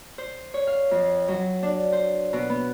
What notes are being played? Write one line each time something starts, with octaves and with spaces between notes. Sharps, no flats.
C5
C#5
F5
F2
F#3
D4
C5
B2
B3